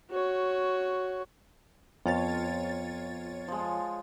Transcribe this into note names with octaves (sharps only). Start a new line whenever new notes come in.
F#4 C#5
F2 B3 F4 C#5 A6
F3 G#3